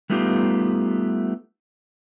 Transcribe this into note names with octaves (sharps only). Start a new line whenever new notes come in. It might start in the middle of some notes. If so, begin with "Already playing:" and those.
G3 A3 B3 D#4 F4 G4